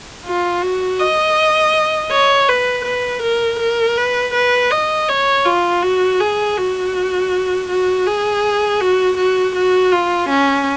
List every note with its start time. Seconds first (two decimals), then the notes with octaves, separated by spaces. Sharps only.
0.25 F4
0.62 F#4
0.99 D#5
2.11 C#5
2.49 B4
2.85 B4
3.22 A#4
3.59 A#4
3.97 B4
4.34 B4
4.71 D#5
5.09 C#5
5.45 F4
5.82 F#4
6.20 G#4
6.57 F#4
7.69 F#4
8.06 G#4
8.80 F#4
9.17 F#4
9.55 F#4
9.92 F4
10.29 C#4